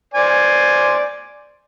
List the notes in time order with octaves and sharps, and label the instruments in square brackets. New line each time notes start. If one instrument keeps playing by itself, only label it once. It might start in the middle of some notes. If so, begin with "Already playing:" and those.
[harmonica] C5 D5 G#5